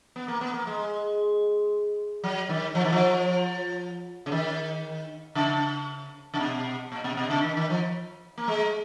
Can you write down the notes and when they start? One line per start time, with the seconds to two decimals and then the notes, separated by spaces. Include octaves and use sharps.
0.16 B3
0.28 A#3
0.41 B3
0.54 A#3
0.67 G#3
2.24 F#3
2.49 D#3
2.75 F3
2.84 D#3
2.92 F3
4.26 C#3
4.32 D#3
5.35 C#3
6.34 C#3
6.40 B2
6.92 A#2
7.04 B2
7.17 B2
7.30 C#3
7.43 D#3
7.57 D#3
7.70 F3
8.38 A#3
8.48 G#3